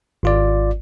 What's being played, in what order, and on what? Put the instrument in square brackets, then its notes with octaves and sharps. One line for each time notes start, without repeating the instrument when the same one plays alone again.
[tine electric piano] G#1 F4 D5